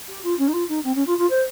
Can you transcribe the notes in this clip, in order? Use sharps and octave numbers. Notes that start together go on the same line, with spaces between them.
G4
F4
C#4
D#4
F4
D#4
C4
C#4
F4
F4
C5